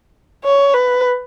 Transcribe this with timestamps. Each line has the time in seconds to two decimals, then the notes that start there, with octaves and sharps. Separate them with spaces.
0.45 C#5
0.74 B4